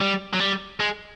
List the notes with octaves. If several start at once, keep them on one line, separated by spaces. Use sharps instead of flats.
G3
F#3
G3
G#3